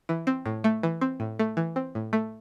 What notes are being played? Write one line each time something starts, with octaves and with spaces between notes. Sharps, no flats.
E3
C4
A2
A3
E3
C4
A2
A3
E3
C4
A2
A3